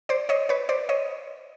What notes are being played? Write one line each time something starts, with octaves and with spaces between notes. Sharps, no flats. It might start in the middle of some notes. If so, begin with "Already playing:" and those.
C5 D5
C#5 D#5
B4 C#5
C5 D5
C#5 D#5